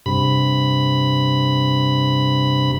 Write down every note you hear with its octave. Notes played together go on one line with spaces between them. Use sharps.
G2 C3 B5